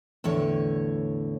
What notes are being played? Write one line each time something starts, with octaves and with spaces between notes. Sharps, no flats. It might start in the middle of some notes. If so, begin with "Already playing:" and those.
E2 A2 D3 C#5